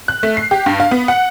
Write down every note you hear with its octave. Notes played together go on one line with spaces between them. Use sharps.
F#6
A3
C7
G4
G2
F5
B3
F#5